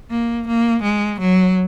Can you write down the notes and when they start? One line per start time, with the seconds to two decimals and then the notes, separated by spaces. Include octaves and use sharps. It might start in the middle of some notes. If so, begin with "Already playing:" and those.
0.10 A#3
0.47 A#3
0.83 G#3
1.20 F#3